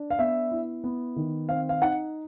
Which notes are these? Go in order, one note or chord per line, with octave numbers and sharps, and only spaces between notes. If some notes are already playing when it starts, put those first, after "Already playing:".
Already playing: D4
F5
B3 E5
E4
B3
D#3
C4 F5
F5
D#4 F#5